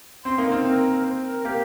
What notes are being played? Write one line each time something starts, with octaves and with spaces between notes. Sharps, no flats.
C4 C6
A#3 D#4
A#4
C4
C4 A#4
C5
A#4
A#3 G4